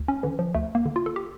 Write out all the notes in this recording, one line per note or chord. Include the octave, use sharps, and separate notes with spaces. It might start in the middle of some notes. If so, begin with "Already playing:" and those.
Already playing: D2
C#4
D3 E3
F3
D2 A3
A#3
D3
F4
A4
G4